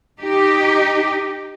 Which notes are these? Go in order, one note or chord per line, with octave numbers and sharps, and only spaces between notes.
D#4 G4